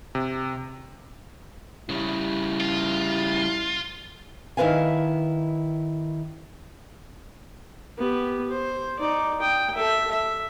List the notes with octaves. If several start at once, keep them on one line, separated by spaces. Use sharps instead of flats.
C3
C#3 G3 E4
F4
D#3 E4 F#4 B4 F5 G#5
B3 G4
C5
D#4 D5
G5 D#6
A4 E5
E5